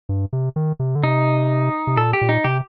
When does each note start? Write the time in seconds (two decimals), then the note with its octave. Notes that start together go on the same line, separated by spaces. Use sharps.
0.09 G2
0.33 C3
0.56 D#3
0.80 C3
0.95 D3
1.03 C3 D#4
1.87 C3
1.97 A#2 A4
2.13 G4
2.21 A#2
2.29 D#4
2.44 C3 G4